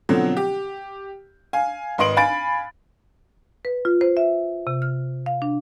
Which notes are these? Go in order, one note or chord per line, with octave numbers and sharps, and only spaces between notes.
B2 D3 F3 F#3 C4
G4
F5 G#5
G#1 B4 D#5 C6 D7 F#7
F5 G#5 B5 A6 D7
B4
F4
C5
E5
C3
F6
F5
D4